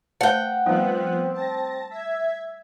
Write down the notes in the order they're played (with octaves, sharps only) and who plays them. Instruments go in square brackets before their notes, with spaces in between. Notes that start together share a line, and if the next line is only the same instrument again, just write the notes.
[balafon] A3 C5 A5 [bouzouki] F#5 G5
[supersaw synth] F3 B3 F#6 [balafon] G3 A3 D#4 [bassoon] C4
[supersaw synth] A5 A#6
E5 G#6